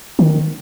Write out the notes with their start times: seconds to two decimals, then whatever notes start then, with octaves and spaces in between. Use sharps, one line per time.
0.19 D#3